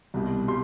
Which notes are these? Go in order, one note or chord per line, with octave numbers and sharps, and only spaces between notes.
C2 B2 G3
G3 C6